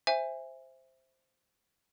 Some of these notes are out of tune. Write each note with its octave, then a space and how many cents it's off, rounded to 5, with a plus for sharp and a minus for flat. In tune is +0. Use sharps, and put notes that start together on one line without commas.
C5 +0 E5 +0 G#5 -20